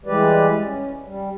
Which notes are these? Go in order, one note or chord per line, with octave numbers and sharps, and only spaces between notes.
E3 G3 G#3 G4 B4 D5
C#4
G3